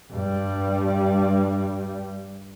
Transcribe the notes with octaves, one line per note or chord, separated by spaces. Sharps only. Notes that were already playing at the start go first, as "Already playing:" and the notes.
G2 G3